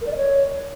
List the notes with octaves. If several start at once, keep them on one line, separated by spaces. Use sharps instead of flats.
A#4
D5
D#5
C#5